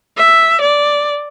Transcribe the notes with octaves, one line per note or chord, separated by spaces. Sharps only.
E5
D5